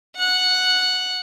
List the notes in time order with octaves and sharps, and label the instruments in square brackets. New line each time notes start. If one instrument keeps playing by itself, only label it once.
[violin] F#5 F#6